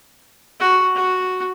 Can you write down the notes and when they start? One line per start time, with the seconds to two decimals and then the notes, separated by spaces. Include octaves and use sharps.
0.60 F#4
0.96 F#4